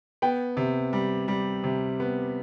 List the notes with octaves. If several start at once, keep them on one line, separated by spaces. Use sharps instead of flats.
B3 G5
C3
G3
G3
C3
B3